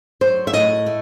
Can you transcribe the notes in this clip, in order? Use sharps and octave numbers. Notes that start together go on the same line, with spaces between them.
F#3 C5
E5
A2 D#5
A3